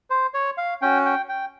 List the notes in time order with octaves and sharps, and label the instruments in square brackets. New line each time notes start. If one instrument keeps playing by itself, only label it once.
[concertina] C5
C#5
F5
C#4 F#4 G5
G5
G5